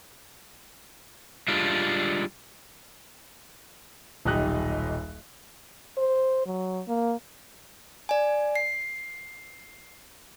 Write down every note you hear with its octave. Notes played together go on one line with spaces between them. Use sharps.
G3 G#3 D4 F4
D#1 B1 D#4 G4 D#5 F#6
C5
F#3
A#3
D5 G#5
C7